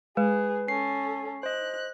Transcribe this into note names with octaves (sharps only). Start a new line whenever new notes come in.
G#3 G#4 B4
C#4 A4 C7
C5 D#5 F#6